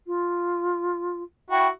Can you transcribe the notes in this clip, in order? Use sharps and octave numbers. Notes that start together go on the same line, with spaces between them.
F4
E4 F#4 G5